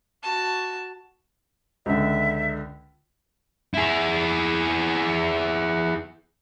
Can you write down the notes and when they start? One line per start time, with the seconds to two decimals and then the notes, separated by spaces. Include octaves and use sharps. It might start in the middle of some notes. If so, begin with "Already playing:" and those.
0.23 F#4 A5
1.86 C#2 D3 E5
3.74 E4 G#4